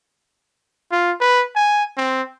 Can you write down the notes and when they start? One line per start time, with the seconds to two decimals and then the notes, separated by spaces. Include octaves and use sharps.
0.92 F4
1.21 B4
1.56 G#5
1.97 C4